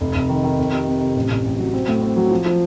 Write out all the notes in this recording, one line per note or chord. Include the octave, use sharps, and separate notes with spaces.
F1
F1
D#3
D#3
F2
C3
C3
C3
A1
A1
A1
F#3
C4
A2
C4
F#3
F3
F3